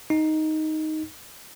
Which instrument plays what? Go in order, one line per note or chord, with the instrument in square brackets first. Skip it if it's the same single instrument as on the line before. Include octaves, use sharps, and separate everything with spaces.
[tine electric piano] D#4